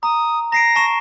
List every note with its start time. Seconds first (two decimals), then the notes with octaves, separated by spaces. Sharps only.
0.03 A#5 D#6
0.52 A#5 A#6 C7 D7
0.76 A5 C#6 E7